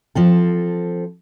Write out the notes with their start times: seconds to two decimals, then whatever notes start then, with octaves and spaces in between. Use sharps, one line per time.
0.15 F3 C4 A4